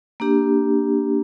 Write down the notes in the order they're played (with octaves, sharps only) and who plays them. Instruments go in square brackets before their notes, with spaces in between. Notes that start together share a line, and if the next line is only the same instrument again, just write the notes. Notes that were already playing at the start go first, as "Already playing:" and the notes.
[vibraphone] A#3 D4 G4